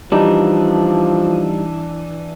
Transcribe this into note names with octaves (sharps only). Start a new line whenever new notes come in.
E3 F3 G3 D4 D#4